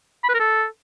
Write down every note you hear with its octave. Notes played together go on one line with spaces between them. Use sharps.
B5
B4
A#4
A4